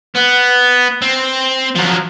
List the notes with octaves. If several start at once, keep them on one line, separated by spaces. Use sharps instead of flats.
B3
C4
F3 F#3